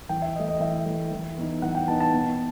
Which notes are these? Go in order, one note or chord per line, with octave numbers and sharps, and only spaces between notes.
E3 G5
E5
A3 E4 D#5
D#5
E3 E5
A3 E4
E3
B3 D#4
E3 F#5
G5
B3 D#4 A5
A5
B2